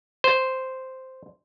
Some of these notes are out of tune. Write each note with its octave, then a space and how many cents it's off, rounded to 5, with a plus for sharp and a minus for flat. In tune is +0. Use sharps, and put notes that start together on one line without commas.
C5 -5